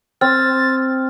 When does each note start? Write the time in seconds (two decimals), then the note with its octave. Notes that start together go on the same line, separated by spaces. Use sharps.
0.21 C4 F6 A6